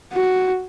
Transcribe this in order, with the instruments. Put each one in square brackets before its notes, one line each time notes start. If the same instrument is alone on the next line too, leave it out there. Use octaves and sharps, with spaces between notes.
[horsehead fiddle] F#4